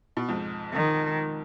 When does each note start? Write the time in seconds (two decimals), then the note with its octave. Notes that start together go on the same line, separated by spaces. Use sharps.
0.17 B2
0.29 F2 G#2
0.73 D#3